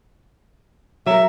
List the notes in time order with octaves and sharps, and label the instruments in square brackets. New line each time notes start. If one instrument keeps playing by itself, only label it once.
[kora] F#3 A#4 [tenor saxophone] E5